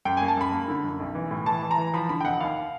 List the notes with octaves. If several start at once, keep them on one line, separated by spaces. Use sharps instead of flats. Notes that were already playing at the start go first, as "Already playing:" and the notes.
F#2 G5
A#3 G#5
A5
F#2 B5
A#3
D3
F#2
B1
E3
A2
E3 A5
E3
A#5
E3
F3 B5
D3 B5
G5
F1 F#5
D#2 F5